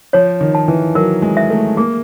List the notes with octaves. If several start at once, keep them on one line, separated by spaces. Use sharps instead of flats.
F3 C#5
D#3
A5
E3
F#3 A#4
G#3
E5
A3
A#3 G#4